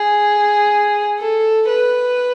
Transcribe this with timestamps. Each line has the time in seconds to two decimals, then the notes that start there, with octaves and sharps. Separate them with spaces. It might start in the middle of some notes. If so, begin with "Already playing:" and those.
Already playing: G#4
1.20 A4
1.68 B4